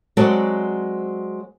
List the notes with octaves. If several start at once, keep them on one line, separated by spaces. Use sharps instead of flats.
F#3 G#3 C4 F#4 A4 D5